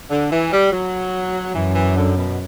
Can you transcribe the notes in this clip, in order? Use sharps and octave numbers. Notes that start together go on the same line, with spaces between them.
D3
E3
G3
F#3
F#2 E3
E3
D3
B2